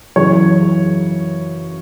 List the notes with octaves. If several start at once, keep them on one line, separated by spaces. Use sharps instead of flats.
F#2 C#3 E3 C#5